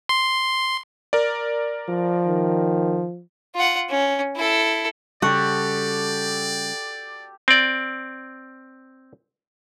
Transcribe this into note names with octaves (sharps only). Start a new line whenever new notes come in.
C6
A#4 D5
F3
D#3
F4 F#5
C#4
E4 A4
C#3 G3 F#4 G4 A4 D5
C4 D5